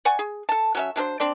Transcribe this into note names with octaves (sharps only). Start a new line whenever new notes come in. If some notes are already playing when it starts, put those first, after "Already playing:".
D5 F#5 G#5 C#6
G#4
A4 A5
F#3 C#4 E5
F#3 D4 A4 C5
C4 D4 D5 C6